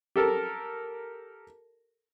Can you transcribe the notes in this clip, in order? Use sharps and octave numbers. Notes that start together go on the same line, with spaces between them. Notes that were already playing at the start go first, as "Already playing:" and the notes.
G4 A4 A#4